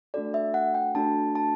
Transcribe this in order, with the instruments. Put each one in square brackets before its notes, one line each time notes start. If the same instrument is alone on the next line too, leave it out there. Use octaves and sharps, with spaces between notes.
[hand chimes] A3 D4 F#4 A4 D5
E5
F#5
G5
A3 D4 F#4 A4 A5
A5